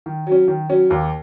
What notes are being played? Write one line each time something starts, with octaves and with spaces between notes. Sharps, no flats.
D#3
F#3 C#4
D#3
F#3 C#4
D#2